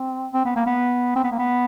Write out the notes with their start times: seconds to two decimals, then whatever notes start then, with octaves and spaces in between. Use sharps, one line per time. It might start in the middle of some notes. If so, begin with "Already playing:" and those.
Already playing: C4
0.34 C4
0.45 B3
0.56 A#3
0.66 B3
1.16 C4
1.24 B3
1.32 A#3
1.39 B3